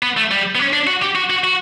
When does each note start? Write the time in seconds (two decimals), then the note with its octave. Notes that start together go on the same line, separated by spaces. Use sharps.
0.03 B3
0.17 A3
0.31 G3
0.55 B3
0.59 C#4
0.73 D4
0.87 F#4
1.02 G4
1.15 F#4
1.30 F#4
1.44 F#4